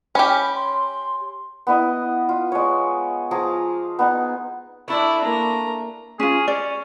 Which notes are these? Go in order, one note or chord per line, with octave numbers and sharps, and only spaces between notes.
C#4 G4 B5
C6
B3 E4 D#5
F4
G#3 C#5
F3 G#4 A#5 D6
B3 D#4
A3 D4 E4 B4 D5
A#3 A#5
C#4 F4 G#4
C#4 D5